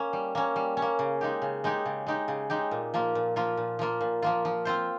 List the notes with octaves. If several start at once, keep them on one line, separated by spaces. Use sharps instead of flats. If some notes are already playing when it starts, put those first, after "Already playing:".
Already playing: A#3 C#4
G3
A#3 C#4
G3
C#4
A#3
C#3
G#3 D#4 G4
C#3
G#3 D#4 G4
C#3
G#3 D#4 G4
C#3
G#3 D#4 G4
A#2
F3 A#3 F4
A#2
F3 A#3 F4
A#2
F3 A#3 F4
A#2
F3 A#3 F4
F3
C4 F4 C5